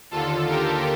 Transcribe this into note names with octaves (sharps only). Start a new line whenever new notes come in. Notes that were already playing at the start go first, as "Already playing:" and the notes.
D#2 D3 F4 A4
G4 A#4